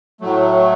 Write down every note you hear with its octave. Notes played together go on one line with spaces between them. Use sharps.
A2 F#3 A3